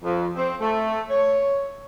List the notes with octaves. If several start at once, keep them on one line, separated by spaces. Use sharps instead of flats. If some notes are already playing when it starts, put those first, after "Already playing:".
F2
C4
A3
C#5